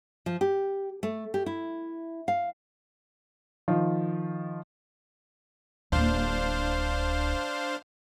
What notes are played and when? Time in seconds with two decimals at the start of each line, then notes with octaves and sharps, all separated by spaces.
0.26 F3
0.41 G4
1.03 A3
1.34 G4
1.46 E4
2.28 F5
3.68 D#3 F3 F4
5.92 D1 A#3 D4 C5 F5